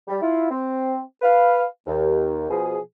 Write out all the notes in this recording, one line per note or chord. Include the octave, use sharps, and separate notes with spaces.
G3
E4 F4
C4
B4 F5
D#2
B2 F3 G#4